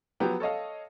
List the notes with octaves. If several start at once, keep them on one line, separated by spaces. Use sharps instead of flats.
F3 F#3 B3 G4
A4 C#5 D#5 F5